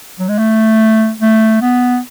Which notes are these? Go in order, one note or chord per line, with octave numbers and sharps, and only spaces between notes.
F#3
G#3
A3
A3
B3